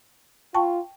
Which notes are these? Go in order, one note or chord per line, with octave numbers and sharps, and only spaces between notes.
F4 G5 A5 C#6